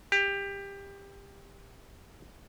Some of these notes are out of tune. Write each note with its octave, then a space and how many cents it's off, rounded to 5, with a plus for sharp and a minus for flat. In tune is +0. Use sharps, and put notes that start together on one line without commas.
G4 +20